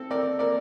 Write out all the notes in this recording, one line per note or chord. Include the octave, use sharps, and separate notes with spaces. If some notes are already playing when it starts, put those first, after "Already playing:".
Already playing: C4 A4
C4 A#4 D5
A#3 A#4 D5